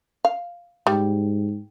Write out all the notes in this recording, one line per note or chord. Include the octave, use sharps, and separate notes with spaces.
F5
G#2 G3